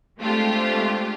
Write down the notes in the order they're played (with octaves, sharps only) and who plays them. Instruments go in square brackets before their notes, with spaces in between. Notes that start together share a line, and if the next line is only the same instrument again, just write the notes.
[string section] G#3 A3 C4 D4 F4 G4